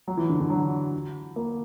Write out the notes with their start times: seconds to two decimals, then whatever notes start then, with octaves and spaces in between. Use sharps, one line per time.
0.08 F#3
0.17 E3
0.29 D3
0.40 D3
0.50 F#3
1.36 A#3